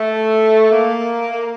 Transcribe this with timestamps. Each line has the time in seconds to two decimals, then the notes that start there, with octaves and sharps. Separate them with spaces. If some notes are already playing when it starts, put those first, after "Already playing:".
Already playing: A3
0.72 A#3